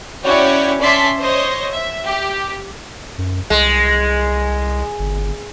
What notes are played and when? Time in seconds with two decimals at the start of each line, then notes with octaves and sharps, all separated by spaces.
0.24 C#4 E4 F#4 C#5 D5 G5
0.80 C#4 D5 E5 A5 C6 B6
1.19 C5 C#5 D#5
1.72 E5
2.05 G4
3.18 F#2
3.50 C2 G#3
5.00 G1